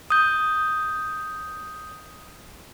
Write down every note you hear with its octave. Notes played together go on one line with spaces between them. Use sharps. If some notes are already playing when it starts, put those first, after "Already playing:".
D#6 G6